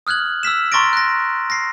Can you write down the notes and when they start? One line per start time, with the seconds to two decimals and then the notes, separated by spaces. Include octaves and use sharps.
0.07 D#6 F6 F#6 G#6 F#7
0.43 E6 F6 B6 E7
0.72 A#5 C6 C#6 A6 A#6 D7
0.93 F#6 A#6
1.50 A#6 C7